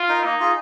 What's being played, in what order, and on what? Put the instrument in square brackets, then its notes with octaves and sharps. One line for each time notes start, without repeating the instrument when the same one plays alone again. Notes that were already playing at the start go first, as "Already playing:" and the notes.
Already playing: [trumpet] F4
[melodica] D#4 A#4
[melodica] A#3 [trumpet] D#4
[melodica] F4 G#4